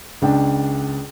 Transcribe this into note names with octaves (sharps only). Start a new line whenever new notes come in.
C#2 D4 G5